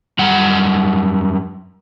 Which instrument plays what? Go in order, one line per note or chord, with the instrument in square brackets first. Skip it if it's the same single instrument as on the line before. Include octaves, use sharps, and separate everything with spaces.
[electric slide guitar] F#2 G3 F#5